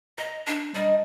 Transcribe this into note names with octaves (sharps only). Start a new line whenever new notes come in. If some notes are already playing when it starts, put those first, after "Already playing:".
D#5 A#5
D4
D#3 G3 D#5 A5